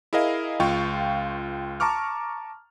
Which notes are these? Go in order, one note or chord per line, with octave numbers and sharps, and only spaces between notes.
E4 G#4 A#4 D#5 F5
C#2 F4 F5 G5 C#6
A5 A#5 C#6 D6 F6